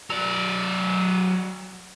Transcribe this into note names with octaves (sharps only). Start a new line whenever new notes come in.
F#3 D5